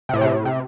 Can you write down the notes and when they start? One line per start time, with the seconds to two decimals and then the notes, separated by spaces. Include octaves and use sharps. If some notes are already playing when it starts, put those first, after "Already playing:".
0.09 C3
0.13 A2
0.21 C3
0.29 A2
0.45 C3